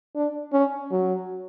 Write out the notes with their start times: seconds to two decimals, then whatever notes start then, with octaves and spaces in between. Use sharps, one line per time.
0.15 D4
0.53 C#4
0.91 F#3